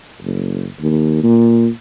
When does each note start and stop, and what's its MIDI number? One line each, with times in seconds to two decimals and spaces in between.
0.22 0.67 30
0.80 1.21 39
1.23 1.67 46